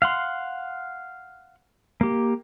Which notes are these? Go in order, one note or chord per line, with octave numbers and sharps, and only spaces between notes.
F5 F#5 C6
A#3 G4